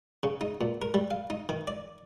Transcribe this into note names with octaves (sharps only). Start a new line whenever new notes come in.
C#3
D#4
A#2
A#4
G3
F5
D#4
D#3
D5